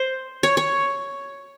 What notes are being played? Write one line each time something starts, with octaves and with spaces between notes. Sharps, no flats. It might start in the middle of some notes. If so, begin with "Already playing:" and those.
Already playing: C5
C#5
C#5